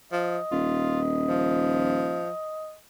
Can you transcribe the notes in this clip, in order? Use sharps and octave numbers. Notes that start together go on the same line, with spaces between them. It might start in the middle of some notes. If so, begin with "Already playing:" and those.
F3 D#5
D#1 F4
F3